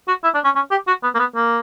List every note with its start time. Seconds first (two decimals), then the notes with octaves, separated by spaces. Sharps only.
0.08 F#4
0.24 E4
0.34 D4
0.45 C#4
0.56 C#4
0.71 G4
0.88 F#4
1.03 B3
1.15 A#3
1.19 B3
1.36 A#3